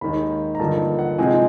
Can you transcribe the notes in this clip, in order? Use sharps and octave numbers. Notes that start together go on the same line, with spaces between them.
D#2 D#3 G#3 B5
A#5
G2 D3 F3 A#3 D#4 A5
F#5
C3 F3 G#3 C4 D#4 G#5